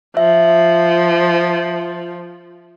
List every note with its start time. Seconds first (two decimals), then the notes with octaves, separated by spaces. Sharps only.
0.17 F3 E5